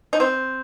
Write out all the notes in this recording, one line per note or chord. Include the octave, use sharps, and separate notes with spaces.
D#4
C4